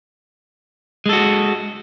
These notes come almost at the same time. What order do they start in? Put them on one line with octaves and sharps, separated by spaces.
G#3 A4 F#4